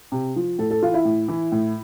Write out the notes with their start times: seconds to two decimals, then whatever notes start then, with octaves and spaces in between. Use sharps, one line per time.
0.12 C3
0.36 F3
0.58 A2 A4
0.71 A4
0.82 E3 F4
0.94 E4
1.05 A2
1.28 E3
1.52 A2